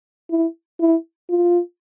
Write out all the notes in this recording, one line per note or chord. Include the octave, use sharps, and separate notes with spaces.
E4
E4
F4